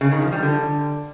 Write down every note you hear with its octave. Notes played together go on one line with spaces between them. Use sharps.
C#3
D#3
F3
G3
D3